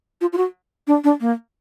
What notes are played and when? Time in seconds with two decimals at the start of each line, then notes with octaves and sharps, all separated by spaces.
0.21 F4
0.33 F4
0.37 F#4
0.87 D4
1.04 D4
1.21 A#3